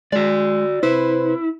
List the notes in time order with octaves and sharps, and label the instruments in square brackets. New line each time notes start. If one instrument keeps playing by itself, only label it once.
[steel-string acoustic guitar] G#3 [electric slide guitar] F#4 D5
[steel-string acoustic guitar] C3 B4 C5 [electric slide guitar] E4